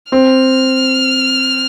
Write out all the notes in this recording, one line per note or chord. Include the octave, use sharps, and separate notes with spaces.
C4 F6